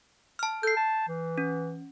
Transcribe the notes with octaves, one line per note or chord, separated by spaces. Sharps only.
A5 F6
A4 G6 C7
A5
E3
C#4